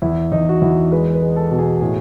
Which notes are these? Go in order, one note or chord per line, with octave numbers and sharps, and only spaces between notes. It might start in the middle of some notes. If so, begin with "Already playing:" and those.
E2 E4
E2 D#4
F#4
E2 E4
G#3 B4
B4
G#3
A4
B2
G#4
A2 G#4